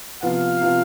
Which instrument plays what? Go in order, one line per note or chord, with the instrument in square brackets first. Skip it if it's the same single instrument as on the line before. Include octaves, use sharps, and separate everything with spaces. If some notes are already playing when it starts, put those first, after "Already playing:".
[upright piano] C3 F3 B3 F4 [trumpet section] F5
[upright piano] C3 F3 B3 F4